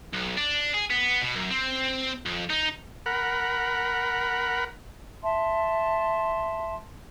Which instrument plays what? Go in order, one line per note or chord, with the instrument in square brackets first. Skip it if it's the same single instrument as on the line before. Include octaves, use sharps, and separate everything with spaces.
[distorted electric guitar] B1
D4
G#4
B3
B2
F#2
C4
F2
D#4
[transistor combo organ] A#4 F#5 B5
[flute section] E5 A5 C6